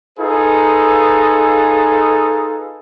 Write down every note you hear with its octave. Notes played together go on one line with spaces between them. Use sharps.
D#4 F4 G#4 A4 B4